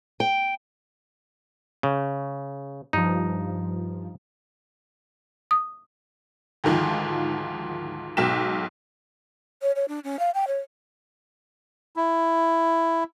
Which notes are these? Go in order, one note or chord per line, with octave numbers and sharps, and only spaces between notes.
G5
C#3
G2 F3 D#4
D#6
D2 G#2 D#3 F3
B1 G#2 B2 G5 B6 E7
C#5
C#5
D4
C#4
F5
G5
C#5
E4